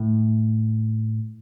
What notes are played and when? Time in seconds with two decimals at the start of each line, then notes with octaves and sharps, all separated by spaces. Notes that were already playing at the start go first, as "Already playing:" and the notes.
Already playing: A2